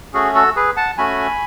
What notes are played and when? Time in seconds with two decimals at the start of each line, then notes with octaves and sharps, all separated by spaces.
0.14 A3 C#4 F#4 G#4
0.35 F#4 A4
0.56 G#4 B4
0.77 F#5 A5
0.98 A3 C#4 F#4 G#5 B5